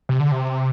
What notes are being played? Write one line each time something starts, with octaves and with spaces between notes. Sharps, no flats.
C3
D3
C3